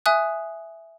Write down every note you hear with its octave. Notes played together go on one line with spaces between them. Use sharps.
E5 G#5 D#6 F#6